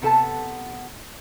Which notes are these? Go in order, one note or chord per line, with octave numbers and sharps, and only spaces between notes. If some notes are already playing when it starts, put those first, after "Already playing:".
C3 B3 A4 A5